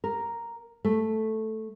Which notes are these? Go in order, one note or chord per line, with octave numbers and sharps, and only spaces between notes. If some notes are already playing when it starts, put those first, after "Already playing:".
A#4
A3